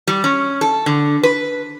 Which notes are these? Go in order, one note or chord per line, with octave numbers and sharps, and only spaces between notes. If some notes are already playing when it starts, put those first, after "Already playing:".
G3
C#4
A4
D3
B4